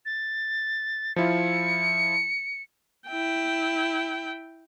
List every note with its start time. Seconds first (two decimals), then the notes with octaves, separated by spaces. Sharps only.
0.06 A6
1.16 F3 E4 F4 C#7
3.09 E4 G5